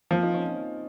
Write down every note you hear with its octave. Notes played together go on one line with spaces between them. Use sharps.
F3 A#3 C4
D#4 F4
C#4 D#4